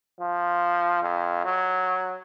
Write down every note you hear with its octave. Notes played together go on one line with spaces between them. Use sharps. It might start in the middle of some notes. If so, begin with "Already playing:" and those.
F3
F2
F#3